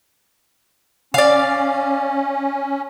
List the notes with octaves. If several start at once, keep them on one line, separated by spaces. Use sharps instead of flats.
C#4 D5 F5